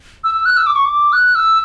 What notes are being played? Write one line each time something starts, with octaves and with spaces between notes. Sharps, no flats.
E6
E6
F#6
E6
D6
C#6
D6
F#6
E6